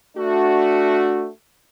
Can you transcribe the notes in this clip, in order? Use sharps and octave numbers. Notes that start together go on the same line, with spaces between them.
A3 D4 F#4